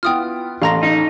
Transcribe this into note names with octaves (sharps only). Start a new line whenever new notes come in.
B3 E4 F4 G5 D#6 F6
A1 A4 F5 A#5 C6 A#6
D#4